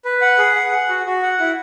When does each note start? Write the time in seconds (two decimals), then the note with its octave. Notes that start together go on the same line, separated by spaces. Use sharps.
0.05 B4
0.21 F#5
0.38 G#4
0.56 F#5
0.72 F#5
0.89 F#4
1.06 F#4
1.23 F#5
1.39 E4